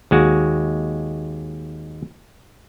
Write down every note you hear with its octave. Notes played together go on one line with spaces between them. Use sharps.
D#2 G#3 F#4